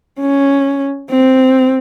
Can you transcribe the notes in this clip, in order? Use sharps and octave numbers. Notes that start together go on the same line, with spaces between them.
C#4
C4